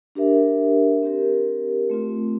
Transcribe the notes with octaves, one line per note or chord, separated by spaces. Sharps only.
D4 G4 A#4 E5
C4 G4 A#4
A3 C4 F4